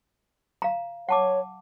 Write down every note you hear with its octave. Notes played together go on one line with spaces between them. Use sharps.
F5 A#5
C#5 F#5 A5 D6